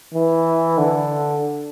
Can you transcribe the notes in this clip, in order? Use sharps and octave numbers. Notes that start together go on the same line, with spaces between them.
E3
D3